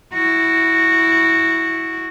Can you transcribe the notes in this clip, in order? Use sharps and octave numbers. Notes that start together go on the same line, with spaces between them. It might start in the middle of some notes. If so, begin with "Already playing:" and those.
E4 F#4